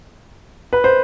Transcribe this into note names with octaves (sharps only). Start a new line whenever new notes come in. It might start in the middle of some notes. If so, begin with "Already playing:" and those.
B4
C5